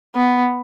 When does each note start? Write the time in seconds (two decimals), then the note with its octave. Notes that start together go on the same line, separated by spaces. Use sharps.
0.15 B3